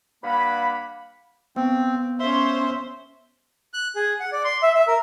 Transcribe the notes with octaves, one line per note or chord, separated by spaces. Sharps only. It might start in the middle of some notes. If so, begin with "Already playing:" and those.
G2 A#3 F5 F#5 B5
B3 C4
C#4 C5 E5 C6
F#6
G#4
F#5
D5
C6
E5
E5
A#4